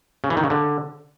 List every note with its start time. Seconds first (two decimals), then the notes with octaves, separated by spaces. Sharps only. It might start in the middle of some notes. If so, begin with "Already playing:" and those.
0.24 C#3
0.30 E3
0.37 D#3
0.44 C#3
0.50 D3